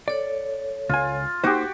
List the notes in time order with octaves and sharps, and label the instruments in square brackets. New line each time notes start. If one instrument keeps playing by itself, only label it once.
[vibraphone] A4 C#5 [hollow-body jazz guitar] D5
[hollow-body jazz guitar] C#2 G#5 [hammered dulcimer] F4
[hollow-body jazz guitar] A#3 D#4 C5 [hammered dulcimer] F#4 G4